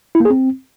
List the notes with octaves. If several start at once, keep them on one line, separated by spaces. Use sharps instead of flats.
E4
A#3
G#4
C4